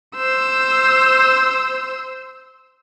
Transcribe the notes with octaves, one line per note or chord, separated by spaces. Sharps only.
C5 E6